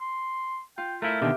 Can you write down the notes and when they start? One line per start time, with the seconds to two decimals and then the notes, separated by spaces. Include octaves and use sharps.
0.01 C6
0.78 F4 G5
1.02 A3 E4 A#4 E5 F5
1.21 B2 D3 D#3 B3 G4